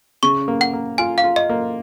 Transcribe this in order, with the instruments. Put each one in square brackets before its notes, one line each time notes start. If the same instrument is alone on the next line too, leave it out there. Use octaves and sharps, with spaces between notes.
[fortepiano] C#3 [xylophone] C#6
[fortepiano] A#3
[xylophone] F#5
[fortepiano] A#3
[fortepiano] F4 [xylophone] G#5
[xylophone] F5
[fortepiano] F4
[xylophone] D#5
[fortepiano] A#3